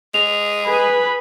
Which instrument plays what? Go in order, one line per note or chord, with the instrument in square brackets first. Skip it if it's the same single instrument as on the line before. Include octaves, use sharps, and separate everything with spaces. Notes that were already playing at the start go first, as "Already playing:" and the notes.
[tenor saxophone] G#3 [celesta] F7
[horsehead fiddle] G#4 B4 [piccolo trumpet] B5